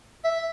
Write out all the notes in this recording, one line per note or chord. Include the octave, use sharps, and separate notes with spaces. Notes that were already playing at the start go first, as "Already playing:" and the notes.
E5